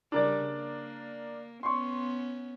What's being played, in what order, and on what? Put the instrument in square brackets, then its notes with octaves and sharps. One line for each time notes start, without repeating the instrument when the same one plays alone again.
[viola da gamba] C#3 G3 [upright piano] D4 A#4 D5
[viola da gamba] A#3
[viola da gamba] B3 C#4 [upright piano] C6 C#6